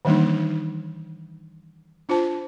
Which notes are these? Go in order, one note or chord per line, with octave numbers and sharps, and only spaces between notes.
D#3 E3 G3 A#3 D4 D#4
D4 F4 C5 A5